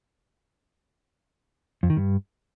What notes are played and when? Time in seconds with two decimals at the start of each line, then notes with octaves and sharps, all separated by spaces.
1.83 F2
1.90 D#3
1.97 G2